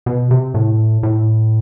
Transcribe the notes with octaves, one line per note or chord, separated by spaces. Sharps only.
B2
C3
A2
A2